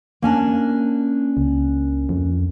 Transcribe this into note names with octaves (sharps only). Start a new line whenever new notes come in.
A#3 C#4 D4
C#2
F2